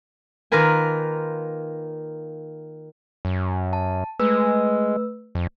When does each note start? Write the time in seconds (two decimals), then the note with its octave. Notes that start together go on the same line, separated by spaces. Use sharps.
0.52 D#3 A#3 F4 A#4 B4 G#5
3.25 F#2
3.73 A5
4.19 G#3 A3 B4 E6
5.35 F2